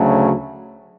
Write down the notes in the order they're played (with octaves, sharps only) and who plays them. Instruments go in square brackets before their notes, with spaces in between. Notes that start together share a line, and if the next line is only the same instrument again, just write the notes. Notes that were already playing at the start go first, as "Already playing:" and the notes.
Already playing: [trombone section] D2 C#3 F#3 A3